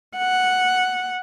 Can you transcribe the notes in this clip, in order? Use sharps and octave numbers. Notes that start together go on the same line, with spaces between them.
F#5